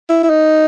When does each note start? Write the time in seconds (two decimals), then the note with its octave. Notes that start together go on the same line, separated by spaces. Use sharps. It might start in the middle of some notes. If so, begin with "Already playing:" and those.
0.09 E4
0.23 E4
0.30 D#4